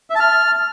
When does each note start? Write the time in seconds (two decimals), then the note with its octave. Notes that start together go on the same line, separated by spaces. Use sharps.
0.10 E5
0.15 A5
0.20 F6